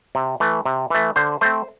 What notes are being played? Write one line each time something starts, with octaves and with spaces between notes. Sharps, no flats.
C3
E3 A3
C3
E3 A3
D3 C5
A3 C4 C5